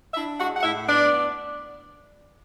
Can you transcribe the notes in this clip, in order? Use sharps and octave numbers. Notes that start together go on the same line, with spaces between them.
D4 E4 E5
G#3 F#4 F#5
F#5
A2 E4 E5
B3 D4 D5